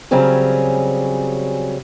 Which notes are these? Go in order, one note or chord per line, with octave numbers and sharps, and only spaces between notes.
C#3 F#3 G3 C4 C#4 G#4